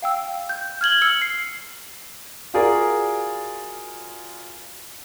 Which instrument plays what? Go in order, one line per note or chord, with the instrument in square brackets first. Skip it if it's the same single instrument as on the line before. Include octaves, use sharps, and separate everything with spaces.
[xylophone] F5 G5 E6
G6
F6 G#6 F#7 G7
E6 C#7 F#7
C7
[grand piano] F4 F#4 G#4 A#4 D5